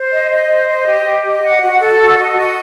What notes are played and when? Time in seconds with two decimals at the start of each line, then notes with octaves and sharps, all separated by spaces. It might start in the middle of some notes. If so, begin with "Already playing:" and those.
Already playing: C5
0.11 D#5
0.30 D#5
0.48 C5
0.67 D#5
0.86 G4
1.05 G4
1.24 D#5
1.43 F#5
1.62 F#4
1.80 A4
1.99 F#4
2.18 D#5
2.37 F#4